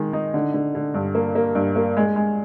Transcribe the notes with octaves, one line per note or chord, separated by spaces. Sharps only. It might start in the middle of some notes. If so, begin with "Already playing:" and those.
Already playing: D#3 G#3
D#4
D3
D3
D3
G2
A#3
A#3
G2
A#3
G#3
G#3